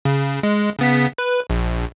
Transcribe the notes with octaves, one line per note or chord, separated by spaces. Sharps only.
C#3
G#3
C#3 B3 B6
B4
A#1